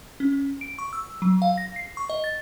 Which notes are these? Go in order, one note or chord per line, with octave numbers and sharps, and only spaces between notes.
C#4
D7
C#6
E6
F#3
F5
A#6
C7
C#6
D#5
A6